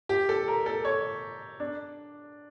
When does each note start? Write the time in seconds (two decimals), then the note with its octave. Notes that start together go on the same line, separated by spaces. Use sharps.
0.09 G4
0.29 A4
0.48 A#4
0.66 A4
0.85 C#5
1.60 D4